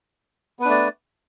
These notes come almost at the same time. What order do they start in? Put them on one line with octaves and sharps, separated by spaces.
B3 B4 D4 A3 D5